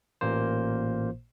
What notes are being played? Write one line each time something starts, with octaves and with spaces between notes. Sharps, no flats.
A1 A#2 A#3 C5